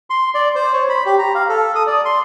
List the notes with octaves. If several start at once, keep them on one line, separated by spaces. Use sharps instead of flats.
C6
D5
C5
C#5
B5
G4
A#5
F5
A4
D#6
D5
C6